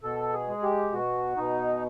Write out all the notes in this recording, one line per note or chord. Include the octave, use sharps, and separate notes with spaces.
B2 A4
G#4
G#3
G4
B2 F#4
B2 D#4